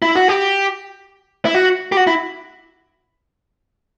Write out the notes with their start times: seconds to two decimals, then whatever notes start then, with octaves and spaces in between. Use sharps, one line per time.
0.02 E4
0.15 F#4
0.28 G4
1.45 E4
1.55 F#4
1.92 G4
1.97 F#4
2.07 E4